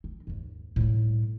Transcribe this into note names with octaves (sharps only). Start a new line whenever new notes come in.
C4
D#2 G#2
A2 G3